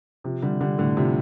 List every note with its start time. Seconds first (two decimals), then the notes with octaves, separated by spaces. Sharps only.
0.24 C3 F3
0.42 D3 G3
0.61 D3 G3
0.78 A2 D3
0.97 C3 F3